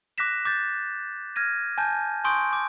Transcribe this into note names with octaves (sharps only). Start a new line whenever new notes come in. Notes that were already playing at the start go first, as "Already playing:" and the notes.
D6 F#6 A#6 B6 E7
D6 G6 A6
F6 G#6 A#6 D#7
G#5 A5 G6
G#5 C6 C#6 D#6 G6 D7
D6